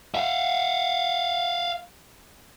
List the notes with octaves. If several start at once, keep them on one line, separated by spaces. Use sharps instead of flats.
E5 F5